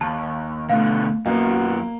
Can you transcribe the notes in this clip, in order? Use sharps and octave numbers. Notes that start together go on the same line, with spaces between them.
D#2 A5
B2 D3 A3 F5
F#2 A#3 B3 C#4 F#4 F#5